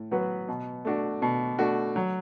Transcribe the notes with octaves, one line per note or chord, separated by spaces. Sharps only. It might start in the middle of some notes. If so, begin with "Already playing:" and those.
Already playing: A2
F#3 B3 F#4 B4
B2
A3 D4 F#4
B2
A3 D4 F#4
F#3